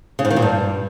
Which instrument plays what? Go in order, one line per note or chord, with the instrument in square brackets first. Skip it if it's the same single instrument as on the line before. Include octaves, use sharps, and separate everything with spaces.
[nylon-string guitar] C#3
G#2
D#3
A#2
G2